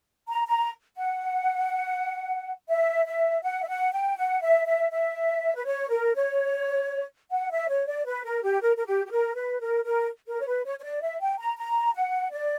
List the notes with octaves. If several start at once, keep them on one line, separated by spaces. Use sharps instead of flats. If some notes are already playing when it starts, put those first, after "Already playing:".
A#5
A#5
F#5
E5
E5
F#5
E5
F#5
G5
F#5
E5
E5
E5
B4
C#5
A#4
C#5
F#5
E5
C#5
D5
B4
A#4
G4
A#4
A#4
G4
G4
A#4
B4
A#4
A#4
A#4
C#5
B4
C#5
C#5
D5
E5
G5
A#5
A#5
F#5
D5